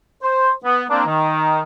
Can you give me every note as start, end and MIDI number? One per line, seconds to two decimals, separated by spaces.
0.23 0.51 72
0.64 0.84 59
0.90 1.01 58
0.90 1.01 60
0.90 1.01 62
1.06 1.62 51